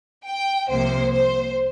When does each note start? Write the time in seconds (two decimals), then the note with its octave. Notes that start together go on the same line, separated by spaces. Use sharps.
0.26 G5
0.69 C2 C3 F3 A#3 C5
1.13 C5